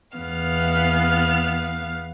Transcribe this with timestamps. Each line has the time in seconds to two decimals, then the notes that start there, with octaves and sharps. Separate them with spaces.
0.17 E2 B3 F5 F6